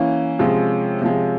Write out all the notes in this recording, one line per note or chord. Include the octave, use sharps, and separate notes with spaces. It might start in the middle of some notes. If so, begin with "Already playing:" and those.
Already playing: E3 A#3 C#4
C3 F3 G#3
C3 F3 G#3